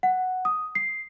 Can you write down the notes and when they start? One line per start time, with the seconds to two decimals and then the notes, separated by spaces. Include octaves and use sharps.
0.03 F#5
0.45 D#6
0.75 C7